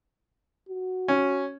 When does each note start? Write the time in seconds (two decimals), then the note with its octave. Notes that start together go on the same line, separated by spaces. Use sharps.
0.69 F#4
1.08 C#4